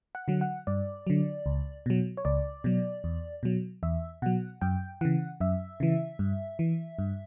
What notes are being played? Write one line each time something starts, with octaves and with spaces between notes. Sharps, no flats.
F#5
D3 F#3
F#5
G2 D5
D3 F#3
C#2
B2 F#3
C#5
C#2 D5
B2 F#3
E2
B2 F#3
E2 E5
B2 F#3 F#5
F#2 G5
C#3 E3 F#5
F#2 E5
C#3 E3
G2
E3
G2